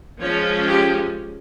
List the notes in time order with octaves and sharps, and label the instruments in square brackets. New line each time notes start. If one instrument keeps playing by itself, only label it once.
[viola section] F3 G#3 C#4 C#5
G4